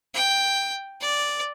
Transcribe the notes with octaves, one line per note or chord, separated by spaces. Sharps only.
G5
D5